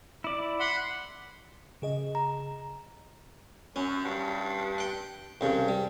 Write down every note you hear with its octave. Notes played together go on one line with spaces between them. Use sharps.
E4 D5
F#5 B5 C6
C#3 G#4 D#5
A#5
F#2 C#4
G2
F#5 G5
C2 G2 C#3
G3